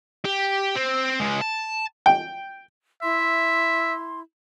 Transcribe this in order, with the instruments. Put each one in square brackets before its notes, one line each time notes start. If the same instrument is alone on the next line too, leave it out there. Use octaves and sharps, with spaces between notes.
[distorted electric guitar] G4
C4
C#2 G#3
A5
[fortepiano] G5
[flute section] E4 C6 [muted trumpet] E5